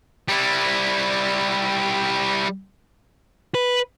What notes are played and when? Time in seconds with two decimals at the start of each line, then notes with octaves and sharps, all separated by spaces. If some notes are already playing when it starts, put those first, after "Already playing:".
0.28 G3 E4
3.55 B4